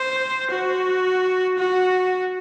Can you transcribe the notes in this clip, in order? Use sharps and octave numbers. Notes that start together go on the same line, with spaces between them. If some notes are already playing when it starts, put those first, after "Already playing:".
Already playing: C5
F#4
F#4